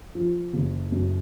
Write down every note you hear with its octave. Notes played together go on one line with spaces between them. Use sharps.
F3
F#1
F#2